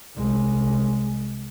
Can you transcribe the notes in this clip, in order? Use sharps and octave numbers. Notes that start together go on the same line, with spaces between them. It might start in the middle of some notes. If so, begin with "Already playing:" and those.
C2 G#3